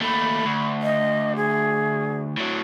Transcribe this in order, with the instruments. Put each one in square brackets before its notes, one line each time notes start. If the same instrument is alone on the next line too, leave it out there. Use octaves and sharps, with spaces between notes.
[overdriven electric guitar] D#2 A3 [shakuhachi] B5
[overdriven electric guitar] D2
[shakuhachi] D#5
G#4
[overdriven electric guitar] A2 F#3